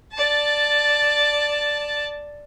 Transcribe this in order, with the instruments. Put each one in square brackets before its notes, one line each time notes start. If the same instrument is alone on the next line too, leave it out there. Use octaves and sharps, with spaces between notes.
[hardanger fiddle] D5 A5